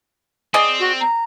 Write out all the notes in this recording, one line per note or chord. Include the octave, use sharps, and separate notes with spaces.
C4 G#4 D5 D#5
F#4
A#5